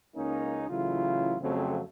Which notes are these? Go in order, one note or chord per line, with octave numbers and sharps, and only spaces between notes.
C#2 A#3 C#4 D#4
A1 C#3 F#3 E4 F4
F2 C#3 F3 F#3 A3 C4